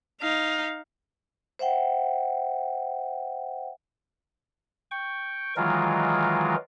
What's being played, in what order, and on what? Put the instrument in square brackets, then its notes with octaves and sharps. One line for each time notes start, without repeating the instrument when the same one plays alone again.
[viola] D#4 F5
[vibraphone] C5 E5 F#5 G5
[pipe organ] G5 C#6
D#3 E3 F#3 G#3 F4 A#4